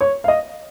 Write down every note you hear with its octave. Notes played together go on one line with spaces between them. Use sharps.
C#5
F5
D#5